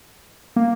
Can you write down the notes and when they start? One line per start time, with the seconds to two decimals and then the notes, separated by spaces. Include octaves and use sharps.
0.56 A#3